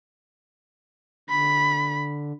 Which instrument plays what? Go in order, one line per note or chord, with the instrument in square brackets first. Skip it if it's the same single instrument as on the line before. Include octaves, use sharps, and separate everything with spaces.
[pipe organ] D3 [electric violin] B5